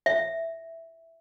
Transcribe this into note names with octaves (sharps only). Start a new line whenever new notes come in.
E5